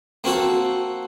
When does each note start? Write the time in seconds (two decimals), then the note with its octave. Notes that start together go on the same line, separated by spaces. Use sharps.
0.24 A#3 C4 F#4 A4